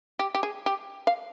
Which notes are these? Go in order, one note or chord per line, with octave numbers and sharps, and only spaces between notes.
G4
G4
G#4
G4
F5